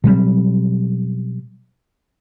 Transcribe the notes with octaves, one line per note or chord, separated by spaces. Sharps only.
B2 F#3 G3 C4